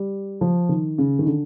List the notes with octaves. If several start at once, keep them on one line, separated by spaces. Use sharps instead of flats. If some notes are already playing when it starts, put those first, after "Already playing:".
Already playing: G3
F3
D#3
C#3
D#3
D3